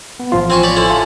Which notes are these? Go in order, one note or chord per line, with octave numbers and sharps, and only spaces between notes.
B3
A1 F3 F4
C4 G#5 C#6
C#5 D5 B5
D3 C#4 E4
F4 A5